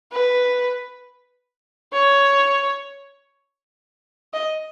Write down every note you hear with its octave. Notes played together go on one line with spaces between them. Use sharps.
B4
C#5
D#5